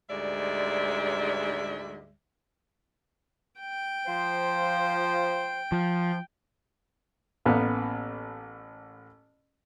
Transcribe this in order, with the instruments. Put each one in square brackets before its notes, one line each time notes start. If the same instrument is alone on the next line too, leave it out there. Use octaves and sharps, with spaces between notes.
[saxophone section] D2 G#2 G3 G#3 D5 E5
[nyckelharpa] G5
[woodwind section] F3 C5
[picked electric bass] F3
[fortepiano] A1 A#3 B3